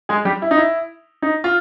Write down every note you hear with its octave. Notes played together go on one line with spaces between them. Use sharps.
G#3 G#4
G3 G4
E4
D#4
E4
D#4
F4